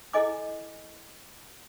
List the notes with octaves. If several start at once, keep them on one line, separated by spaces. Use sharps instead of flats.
E4 G#4 A4 D#5 G#5 D6